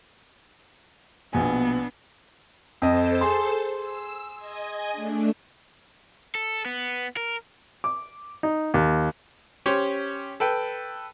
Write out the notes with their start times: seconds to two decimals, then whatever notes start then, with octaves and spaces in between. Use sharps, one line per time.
1.33 A#1 B2 B3 D4 G#5
2.82 F2 A4 C5 D#5 A5
3.21 G#4 C6
3.75 E6
4.36 D#5 G#5
4.92 A3 D4
6.35 A4
6.66 B3
7.17 A#4
7.84 D6
8.43 D#4
8.74 D#2
9.66 C#4 G4 C5 C#5
10.40 A4 B4 G5